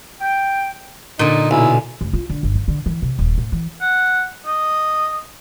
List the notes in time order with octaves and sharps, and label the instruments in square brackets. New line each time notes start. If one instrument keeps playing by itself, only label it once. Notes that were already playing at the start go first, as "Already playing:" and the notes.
[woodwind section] G5
[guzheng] A#2 D3 [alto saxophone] D#4
[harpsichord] B1 [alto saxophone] E4 [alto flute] G#5
[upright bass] F1
F4
D3
G1
D#3
D3
E3
C3
D#1
A2
E3
[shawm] F#5
D#5